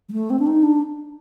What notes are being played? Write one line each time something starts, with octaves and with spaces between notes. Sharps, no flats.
G3
A3
C4
D4
D#4
D4